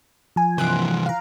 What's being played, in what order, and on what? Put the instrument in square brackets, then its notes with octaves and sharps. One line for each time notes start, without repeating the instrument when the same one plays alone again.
[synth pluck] F3 G#5
[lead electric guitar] C2 E3 [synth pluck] C6 F#6 D7
[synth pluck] F5 A#5